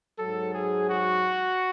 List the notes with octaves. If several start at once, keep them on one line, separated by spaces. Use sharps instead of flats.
G#2 F#3 A4
G#4
F#4